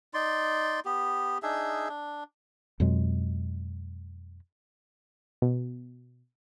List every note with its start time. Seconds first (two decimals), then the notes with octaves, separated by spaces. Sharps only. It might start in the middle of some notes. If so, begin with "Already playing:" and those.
0.14 D#4 D5 C6
0.85 B3 G4
1.43 D4 D#4 G#4 E5
1.89 D4
2.80 F2 B2 F#3 G#3
5.42 B2